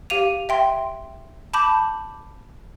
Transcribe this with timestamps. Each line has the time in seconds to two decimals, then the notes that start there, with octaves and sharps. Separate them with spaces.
0.10 G4 F5 D#7 F7
0.49 E5 G5 C6
1.54 A5 B5 D6 G6